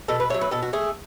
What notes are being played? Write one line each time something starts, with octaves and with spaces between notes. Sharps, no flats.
B2 A4
B4
F#3 A3 C#5
B4
B2 A4
F#4
A3 G#4